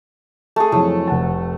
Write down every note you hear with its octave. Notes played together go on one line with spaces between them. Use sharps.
A3 G#4
F2 E3 F#3 A3
F1 F#5 A5